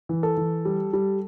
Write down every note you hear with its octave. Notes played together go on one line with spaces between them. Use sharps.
E3
A4
E3
G3
G3